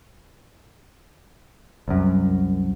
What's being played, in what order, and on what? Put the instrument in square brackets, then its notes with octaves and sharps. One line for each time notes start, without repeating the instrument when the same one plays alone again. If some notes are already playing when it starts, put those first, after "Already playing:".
[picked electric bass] C2 F#2